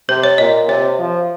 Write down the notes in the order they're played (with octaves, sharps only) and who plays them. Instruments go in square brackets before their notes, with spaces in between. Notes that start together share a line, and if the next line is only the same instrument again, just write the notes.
[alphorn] C3 [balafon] C5
[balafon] C#5
[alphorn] A#2 [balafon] D#5
[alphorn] C3 [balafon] C#5
[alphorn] F3